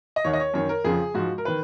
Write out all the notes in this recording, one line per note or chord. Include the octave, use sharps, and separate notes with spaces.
D#5
D#2 D#3 C#5
D#5
C#5
F#2 D#3 C#5
A#4
F2 C#3 F3 G#4
G#2 F3 F#4
A#4
D#3 B4